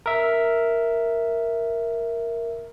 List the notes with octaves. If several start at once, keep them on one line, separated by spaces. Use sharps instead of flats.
A#4 E5